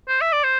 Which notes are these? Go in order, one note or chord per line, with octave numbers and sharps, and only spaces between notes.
C5
E5
D5
C5